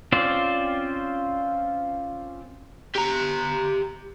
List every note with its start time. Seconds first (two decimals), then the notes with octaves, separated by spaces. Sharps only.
0.12 C4 C#4 F4 C5 D5
2.95 G4 A#5